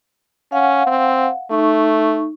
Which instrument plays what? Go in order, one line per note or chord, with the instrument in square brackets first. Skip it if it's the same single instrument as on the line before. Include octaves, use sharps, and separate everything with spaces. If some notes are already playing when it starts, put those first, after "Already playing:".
[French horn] C#4 [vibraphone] F5 F#5
[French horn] C4
[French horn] A3 [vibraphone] D#4 C#6